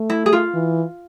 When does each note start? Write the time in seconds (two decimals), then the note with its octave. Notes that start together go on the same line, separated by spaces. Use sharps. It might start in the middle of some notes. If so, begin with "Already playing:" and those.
Already playing: A3
0.10 E4
0.26 G#4
0.33 F4
0.54 E3